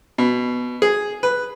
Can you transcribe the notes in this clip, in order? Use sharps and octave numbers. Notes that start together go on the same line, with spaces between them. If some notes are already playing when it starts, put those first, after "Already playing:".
B2
G#4
B4